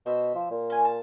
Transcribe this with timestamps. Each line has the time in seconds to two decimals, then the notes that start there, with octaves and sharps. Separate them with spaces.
0.06 B2 C5 E5
0.35 F3
0.51 A#2
0.70 C#4 G#5
0.85 A5